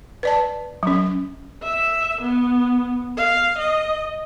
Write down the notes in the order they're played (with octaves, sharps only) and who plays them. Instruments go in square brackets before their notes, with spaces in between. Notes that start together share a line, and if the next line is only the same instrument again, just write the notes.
[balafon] B4 D5 A5
F#3 C#4
[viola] E5
B3
F5
D#5